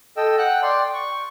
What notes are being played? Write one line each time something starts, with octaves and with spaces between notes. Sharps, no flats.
A4 D#5 G5 E6
F#5 G5 F#6
D5 G5 C6
C#6